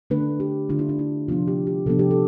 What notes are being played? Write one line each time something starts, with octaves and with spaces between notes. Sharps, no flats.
D3 A3 D4 B4
G4
D3 A3 D4 F4
E4
D4
E4
C3 F3 B3 D4 F4
G4
G4
C3 F3 B3 D4 A4
G4
A4